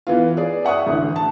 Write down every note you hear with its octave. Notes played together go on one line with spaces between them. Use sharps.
E3 B3 F4
G#4 D5
E5 F#5 C#6 D#6 F#6
A1 D2
A5